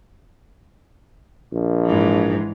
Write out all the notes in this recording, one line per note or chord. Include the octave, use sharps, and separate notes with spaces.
A#1
G#2 E3